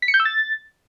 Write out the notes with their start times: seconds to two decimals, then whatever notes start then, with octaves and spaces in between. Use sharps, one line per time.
0.02 B6
0.08 C#7
0.14 G6
0.20 E6
0.25 A6